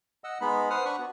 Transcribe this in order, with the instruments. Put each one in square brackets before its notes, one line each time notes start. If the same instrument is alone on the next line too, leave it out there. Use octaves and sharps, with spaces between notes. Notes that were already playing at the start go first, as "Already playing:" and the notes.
[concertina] D#5 F#5 E6
G#3 B3 D#4 B5
B4 C5 F#5 D#6 F6
D4 F#5 B5 C#6
B3 F#4